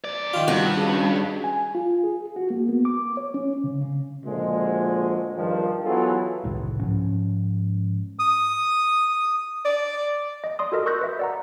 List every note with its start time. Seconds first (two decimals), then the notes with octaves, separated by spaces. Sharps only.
0.04 F#2 D5
0.34 D#3 F4
0.48 C2 G2 F#4
0.76 C#3
1.44 G#5
1.75 F4
2.03 G#4
2.36 F#4
2.50 A#3
2.69 B3
2.85 D6
3.17 C#5
3.34 C#4
3.64 C#3
3.81 C#3
4.26 D2 A#2 F3 G#3
5.36 G2 D#3 F3
5.84 E3 F#3 B3 F4 G#4 A4
6.44 F#1 C2 A2 D#3
6.80 G#2 F3 C#4
8.19 D#6
9.65 D5
10.44 D#5
10.59 D5 C6 D#6
10.72 F#4 A4 A#4 D#5
10.86 C#6 E6 F#6 G6 A#6
11.01 B4 E5
11.19 D5 F#5 A#5